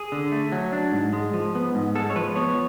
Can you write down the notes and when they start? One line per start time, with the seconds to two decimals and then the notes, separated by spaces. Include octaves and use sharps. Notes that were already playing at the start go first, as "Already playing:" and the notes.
Already playing: G#4
0.12 D3
0.32 A3
0.52 F#3
0.72 D4
0.93 G#2
1.13 G#3
1.33 F3
1.55 B3
1.75 G#2
1.96 G#3 A4
2.10 C#5
2.16 F3 B4
2.36 B3 C#5